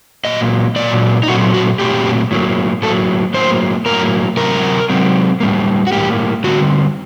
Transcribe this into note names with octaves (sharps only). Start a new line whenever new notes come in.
A#2 F#3 A#3 D#5
A#2 F#3 A#3 D5
D#4
A#2 F#3 A3 C4 F#4
F#4
A#2 F#3 A3 C4 G4
A2 F#3 A#3
A2 F#3 A#3 A4
A2 F#3 A#3 C5
A2 F#3 A#3 A#4
C3 F#3 C4 A#4
C3 F#3 C4
A2 G3 A#3
F#4
A2 G3 A#3 G4
D3 G3 C4 F#4